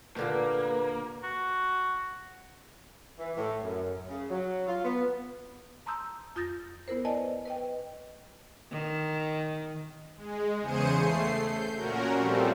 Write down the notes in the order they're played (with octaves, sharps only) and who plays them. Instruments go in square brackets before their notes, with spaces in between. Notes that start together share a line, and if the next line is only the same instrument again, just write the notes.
[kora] A#2 D3 G4 [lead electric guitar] A#3 [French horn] B4
[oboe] F#4
[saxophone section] E3
A2
F#2
C#3
F#3
F4
B3
[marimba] A5 A#5 C6 D#6 E6 G6
F2 F4 D#6 G6 A6 A#6
B3 E4 A#4 C5
B4 D5 D#5 G#5 A5
B4 D#5 G5
[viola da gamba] D#3
[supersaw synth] G#3
E2 C#3 G#4 C5 C#7 D#7
A3 C7
G6
A#2 C#4 F#4 A#4
F3 G3 A3 C4